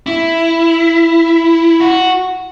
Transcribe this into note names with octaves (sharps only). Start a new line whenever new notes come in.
E4
F#4